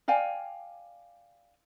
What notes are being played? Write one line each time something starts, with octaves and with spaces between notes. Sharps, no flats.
D5 F5 G5 G#5